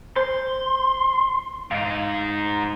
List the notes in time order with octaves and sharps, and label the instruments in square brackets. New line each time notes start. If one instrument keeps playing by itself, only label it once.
[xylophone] C5 [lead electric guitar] C6
[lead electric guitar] G#2 D#4 [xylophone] F5 D7